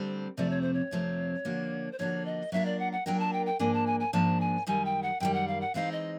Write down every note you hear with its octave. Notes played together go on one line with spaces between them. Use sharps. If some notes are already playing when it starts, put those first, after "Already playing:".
Already playing: D2 D3 G3 C4
F2 C3 F3 A3 C4 D5
C#5
C5
C#5
F2 C3 F3 A3 C4
D3 F3 A#3 D4 F#4
C5
D3 F3 A#3 D4 F#4 C#5
D#5
F#3 A#3 D4 F4 A#4 E5
D5
F#5
F#5
F#3 A#3 D4 F4 A#4 G5
A5
G5
G5
G#2 F3 A#3 D4 G#5
A5
G#5
G#5
G#2 F3 A#3 D4 A5
G#5
F#2 D#3 G3 G#5
G5
F#5
F#2 D#3 G3 G5
F#5
F5
F#5
E3 G#3 C4 D#4 F5
D#5